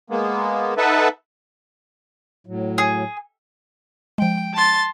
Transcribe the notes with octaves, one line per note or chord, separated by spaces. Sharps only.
G#3 A#3 B3
D#4 A4 B4 E5 F#5 A5
A2 F#3
G#4
F3 G#3 G5
A5 C6 A6